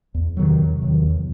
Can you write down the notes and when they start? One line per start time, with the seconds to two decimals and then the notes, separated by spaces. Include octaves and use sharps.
0.14 E2
0.37 C3 D#3 F#3
0.59 E2
0.82 C3 D#3 F#3
1.03 E2